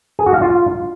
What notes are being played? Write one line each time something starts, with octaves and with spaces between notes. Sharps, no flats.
G#4
F#4
F5
F4